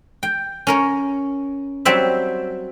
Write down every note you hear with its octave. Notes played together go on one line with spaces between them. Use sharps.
G5
C#4 A#4 C#5
F#3 G3 C4 E5